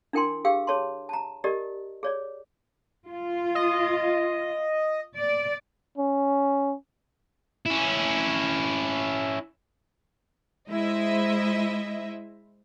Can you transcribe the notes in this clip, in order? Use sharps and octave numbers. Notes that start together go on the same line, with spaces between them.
D4 E4 A#4 G5 G#5 C6
G4 G#4 F5 G5 E6
G#4 C#5 A5 C6
A5 A#5
G4 A#4 D5 D#5
G#4 C#5 D5
F4
D#5
D5
C#4
C#4 E4
G#3 E4 C5 D#5 E5